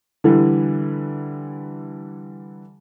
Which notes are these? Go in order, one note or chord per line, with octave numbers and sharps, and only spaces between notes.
D3 E3 G3